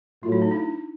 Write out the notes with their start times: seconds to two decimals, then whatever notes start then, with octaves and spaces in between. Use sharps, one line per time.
0.23 A2 F#3 A3 F4
0.32 E4
0.42 D#4
0.51 D4 E4